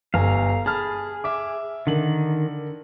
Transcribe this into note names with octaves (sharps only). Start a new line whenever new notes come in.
G1 F5 G#5 A#5
G#4 A5 B5 F6
E5 D6
D3 D#3 A#4 F#7